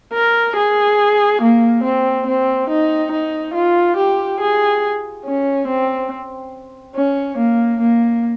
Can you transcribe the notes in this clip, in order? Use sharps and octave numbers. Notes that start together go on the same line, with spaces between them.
A#4
G#4
A#3
C4
C4
D#4
D#4
F4
G4
G#4
C#4
C4
C#4
A#3
A#3